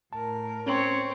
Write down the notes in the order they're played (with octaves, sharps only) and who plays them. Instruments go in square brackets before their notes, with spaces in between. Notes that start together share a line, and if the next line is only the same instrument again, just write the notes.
[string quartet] A2 A#4 [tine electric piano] A5
[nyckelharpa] C4 [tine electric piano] C#4 [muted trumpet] C#5